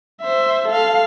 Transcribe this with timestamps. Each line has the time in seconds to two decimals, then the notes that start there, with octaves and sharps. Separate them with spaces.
0.21 C5 E5
0.68 A4 F5